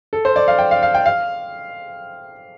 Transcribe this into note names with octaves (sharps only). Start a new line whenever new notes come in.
A4
C5
D5
F5
G5
F5
F5
G5
F5